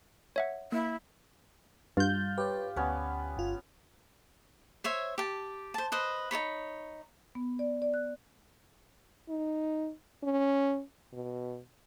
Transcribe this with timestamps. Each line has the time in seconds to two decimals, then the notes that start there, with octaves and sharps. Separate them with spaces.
0.36 C#5 E5 F#5
0.72 A#3 E4
1.97 G2 F4 G6
2.38 G4 B4 C#5
2.76 D2 B3 C#4 B4
3.37 G1 F4
4.84 C5 C#5 E5
5.18 G4 A5
5.74 C5 A5
5.92 B4 C5 D#5
6.31 D#4 A4 C#5 B5
7.35 B3
7.59 D5
7.82 D5
7.94 F#6
9.29 D#4
10.24 C#4
11.13 B2